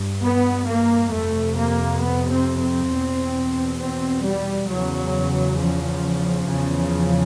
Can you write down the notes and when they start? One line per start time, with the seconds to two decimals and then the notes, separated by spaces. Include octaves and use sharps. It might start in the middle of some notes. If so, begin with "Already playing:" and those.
Already playing: G2
0.22 B3
0.66 A#3
1.11 F2 C3 A3
1.56 A#3
2.00 B3
2.30 C4
2.60 C4
2.90 E2 B2
3.78 C4
4.23 G3
4.68 E2 C#3 F#3
5.57 F3
6.46 E2 C#3